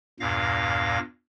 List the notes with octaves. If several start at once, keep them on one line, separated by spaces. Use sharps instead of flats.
E2 G2 A#2 F5 A#6